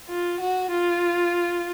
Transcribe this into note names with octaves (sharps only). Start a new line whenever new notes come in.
F4
F#4
F4